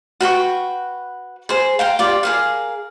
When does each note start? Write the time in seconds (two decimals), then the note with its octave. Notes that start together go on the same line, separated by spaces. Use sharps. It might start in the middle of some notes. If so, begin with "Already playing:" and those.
0.21 F#4 B4 G5 C#6
1.49 G#4 C5
1.79 F5 G5 A#5
1.99 F4 G4 D5
2.23 G#4 A#4 F5